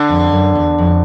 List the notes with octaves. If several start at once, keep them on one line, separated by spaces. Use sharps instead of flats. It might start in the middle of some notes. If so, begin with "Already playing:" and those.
Already playing: D3
F2
F#2
E2
F2